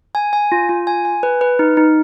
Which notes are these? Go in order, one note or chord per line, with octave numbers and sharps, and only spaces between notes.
G#5
G#5
F4
F4
G#5
G#5
B4
B4
D#4
D#4